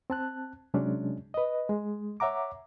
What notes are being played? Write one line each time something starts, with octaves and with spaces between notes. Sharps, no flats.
C4 A5 F#6
C3 F#3 G#3 C#4 D4
B4 D#5
G#3
C#5 E5 F#5 A#5 D6